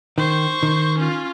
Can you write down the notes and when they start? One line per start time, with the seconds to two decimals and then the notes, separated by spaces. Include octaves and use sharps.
0.18 D#3 C5 C#6
0.63 D#3
0.98 C#4 F4